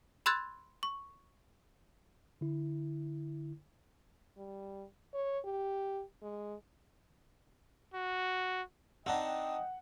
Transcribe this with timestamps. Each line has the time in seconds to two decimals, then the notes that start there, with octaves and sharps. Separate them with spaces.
0.26 B5 C6 E6 F#6 G#6 A6
0.83 C#6
2.41 D3 E4
4.37 G3
5.14 C#5
5.44 G4
6.22 G#3
7.94 F#4
9.06 C4 D4 D#4 D#5 F#5 G5